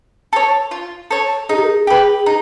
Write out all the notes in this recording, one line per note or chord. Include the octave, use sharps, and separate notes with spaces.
A4 C#5
F4
A4 C#5
D#4 G#4
G4
A#4
G#4
G4 B4
D#4